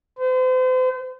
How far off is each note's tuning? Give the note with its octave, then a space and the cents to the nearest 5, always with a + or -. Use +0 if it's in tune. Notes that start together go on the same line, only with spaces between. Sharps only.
C5 -40